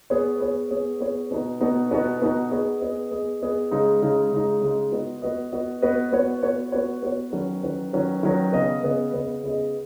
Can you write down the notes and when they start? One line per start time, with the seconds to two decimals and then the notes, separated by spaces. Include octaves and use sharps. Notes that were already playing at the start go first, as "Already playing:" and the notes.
0.10 B3 G#4 C#5
0.41 B3 G#4 C#5
0.71 B3 G#4 C#5
1.01 B3 G#4 C#5
1.31 B2 B3 D#4 F#4
1.61 B2 B3 D#4 F#4
1.91 B2 B3 D#4 F#4
2.21 B2 B3 D#4 F#4
2.51 B3 G#4 D#5
2.81 B3 G#4 D#5
3.12 B3 G#4 D#5
3.41 B3 G#4 D#5
3.71 C#3 G#3 D#4
4.02 C#3 G#3 D#4
4.32 C#3 G#3 D#4
4.62 C#3 G#3 D#4
4.92 B3 F#4 B4 D#5
5.22 B3 F#4 B4 D#5
5.52 B3 F#4 B4 D#5
5.82 B3 F#4 B4 D#5
6.13 B3 F#4 C#5
6.43 B3 F#4 C#5
6.72 B3 F#4 C#5
7.03 B3 F#4 C#5
7.32 D#3 F#3 C#4 B4
7.63 D#3 F#3 C#4 B4
7.93 D#3 F#3 C#4 B4
8.23 D#3 F#3 C#4 B4
8.53 C#3 B3 G#4 D#5
8.83 C#3 B3 G#4 D#5
9.13 C#3 B3 G#4 D#5
9.43 C#3 B3 G#4 D#5